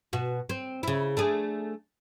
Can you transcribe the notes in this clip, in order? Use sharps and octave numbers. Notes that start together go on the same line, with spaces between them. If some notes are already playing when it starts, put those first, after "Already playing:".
B2 F#4
C4
C#3 E4
A3 D4 G#4